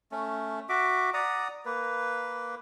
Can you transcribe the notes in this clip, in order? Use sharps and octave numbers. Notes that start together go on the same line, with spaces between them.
A3 C#4
F#4 E5 D6
D5 F#5 A#5 D#6
A#3 B4